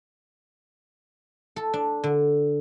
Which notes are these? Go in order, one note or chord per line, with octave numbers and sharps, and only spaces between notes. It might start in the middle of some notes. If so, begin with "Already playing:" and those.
A4
D4
D3